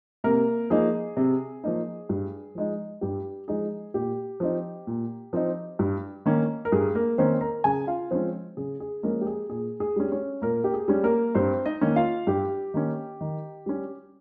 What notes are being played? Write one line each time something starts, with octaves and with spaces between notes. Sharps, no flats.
C3 A#3 A#4
F3 A#3 D#4 G#4
C3
F3 A#3 D#4
G2
F3 G#3 D#4
G2 G4
F3 G#3 D#4 G#4
A#2 G4
F3 C4 D#4
A#2
F3 C4 D#4
G2
D#3 A#3 C#4
A#4
G2 G#4
A#3 A#4
D#3 A#3 C4 C#4 C5
A#4 A#5
C#3 G#4 G#5
F4 F5
F3 G#3 C4 C#4 C5
C#3 G#4
G#4
F3 G#3 A#3 C#4 A#4
G4
G#4
A#2 G#4
G#4
G3 C#4
C#4 C#5
A#2 A#3 A#4
G4
G#4
G3 C#4
A#3 A#4
G2 C4 C5
D#4 D#5
D#3 A#3 C#4
F4 F5
G2 G4
D#3 A#3 C#4
D#3
G3 C#4